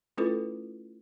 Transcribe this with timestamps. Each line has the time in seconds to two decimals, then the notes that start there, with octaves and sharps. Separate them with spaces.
0.18 A3 C#4 E4 F4 A4 B4